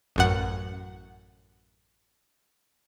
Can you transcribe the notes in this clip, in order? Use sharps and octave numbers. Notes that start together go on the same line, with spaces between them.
A1 F#2 F#5